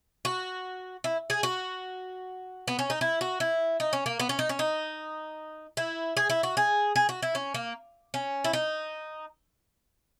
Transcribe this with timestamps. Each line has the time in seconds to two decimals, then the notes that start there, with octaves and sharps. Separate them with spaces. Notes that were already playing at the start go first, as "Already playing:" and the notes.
0.25 F#4
1.04 E4
1.30 G#4
1.43 F#4
2.68 B3
2.79 C#4
2.90 D#4
3.01 E4
3.21 F#4
3.40 E4
3.80 D#4
3.93 C#4
4.06 A#3
4.20 B3
4.29 C#4
4.39 D#4
4.49 C#4
4.59 D#4
5.77 E4
6.17 G#4
6.30 E4
6.43 F#4
6.57 G#4
6.96 G#4
7.09 F#4
7.22 E4
7.35 C#4
7.54 A#3
8.14 C#4
8.44 E4
8.53 D#4